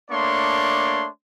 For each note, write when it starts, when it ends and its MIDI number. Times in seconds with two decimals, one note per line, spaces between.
0.11 1.07 57
0.11 1.07 58
0.11 1.07 62
0.11 1.07 73
0.11 1.07 84